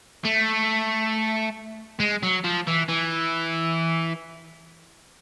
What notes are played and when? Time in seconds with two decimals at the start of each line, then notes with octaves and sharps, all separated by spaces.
0.24 A3
2.00 G#3
2.23 F#3
2.44 F3
2.67 E3
2.89 E3